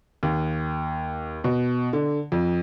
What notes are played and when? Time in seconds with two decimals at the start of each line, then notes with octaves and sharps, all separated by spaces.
0.23 D#2
1.44 B2
1.93 D3
2.32 F2